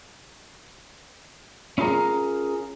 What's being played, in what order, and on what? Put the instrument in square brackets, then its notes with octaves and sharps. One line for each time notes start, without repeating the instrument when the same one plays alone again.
[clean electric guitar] C#4 E4 F4 G#4 A#4 A#5